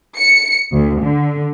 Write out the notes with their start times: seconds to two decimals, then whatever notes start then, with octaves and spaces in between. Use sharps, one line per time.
0.16 C#7
0.72 D2
1.02 D3